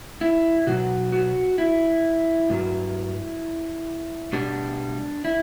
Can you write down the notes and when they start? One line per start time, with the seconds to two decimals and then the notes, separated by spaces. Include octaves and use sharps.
0.21 E4
0.67 B2 F#3 F#4
1.12 F#4
1.58 E4
2.50 G2 F#3
4.33 B2 G3 D4
5.25 E4